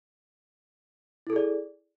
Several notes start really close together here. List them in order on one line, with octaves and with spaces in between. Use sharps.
E4 A4 G#4 D5